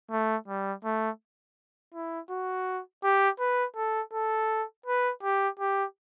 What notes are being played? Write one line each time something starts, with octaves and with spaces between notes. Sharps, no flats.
A3
G3
A3
E4
F#4
G4
B4
A4
A4
B4
G4
G4